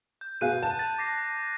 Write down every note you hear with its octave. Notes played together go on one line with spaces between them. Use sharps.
G6
B2 G#4 F5 F#6 D#7
A5
A6
D6 A#6 C7